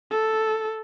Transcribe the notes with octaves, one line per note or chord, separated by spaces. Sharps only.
A4